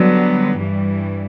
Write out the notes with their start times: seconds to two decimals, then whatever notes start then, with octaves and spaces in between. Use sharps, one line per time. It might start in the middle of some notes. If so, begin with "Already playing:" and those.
Already playing: D3 F#3 G3 B3
0.58 G2 E3 G3